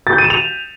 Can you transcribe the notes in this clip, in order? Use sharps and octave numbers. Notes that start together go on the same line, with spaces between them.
A6
G6
D#7
E7
F7